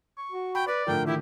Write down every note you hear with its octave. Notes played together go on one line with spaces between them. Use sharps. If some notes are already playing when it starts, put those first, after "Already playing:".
C#6
F#4
G5 B5
B4 D5
A2 D3 F3 A#4 G5
D#3 E4 G4